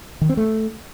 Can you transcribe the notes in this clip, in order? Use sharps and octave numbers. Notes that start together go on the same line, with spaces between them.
D#3
C4
A3